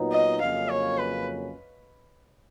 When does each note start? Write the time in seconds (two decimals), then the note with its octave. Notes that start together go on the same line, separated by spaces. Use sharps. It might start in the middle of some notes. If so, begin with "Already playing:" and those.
Already playing: A#2 F#3 B3 D#4
0.12 D#5
0.41 F2 C#3 F#3 A#3 C#4 F5
0.69 C#5
0.98 B4